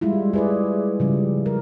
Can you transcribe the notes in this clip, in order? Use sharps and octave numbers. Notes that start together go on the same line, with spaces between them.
G3 G#3 E4 F4
G#4 B4 D5
C#3 F3 G3
A#4